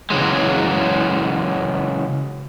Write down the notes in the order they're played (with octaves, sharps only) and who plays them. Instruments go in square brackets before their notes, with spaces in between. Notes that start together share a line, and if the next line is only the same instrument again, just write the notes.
[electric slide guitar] C#3 E3 F#3 G#3